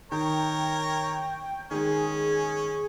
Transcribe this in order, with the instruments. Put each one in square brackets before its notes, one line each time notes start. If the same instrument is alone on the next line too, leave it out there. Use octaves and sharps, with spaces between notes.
[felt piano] D#3 [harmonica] A#4 C#5 [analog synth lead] G5
[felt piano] D#3 G#3 [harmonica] C#4 [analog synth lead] G#4